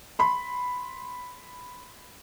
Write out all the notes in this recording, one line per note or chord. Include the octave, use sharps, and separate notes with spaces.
B5 C6